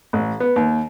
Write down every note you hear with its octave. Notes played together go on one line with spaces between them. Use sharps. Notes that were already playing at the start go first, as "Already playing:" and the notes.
A1
B3
D#2